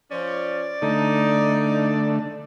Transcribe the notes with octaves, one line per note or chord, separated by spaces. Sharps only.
F3 C#4 D5
D3 A3 D#4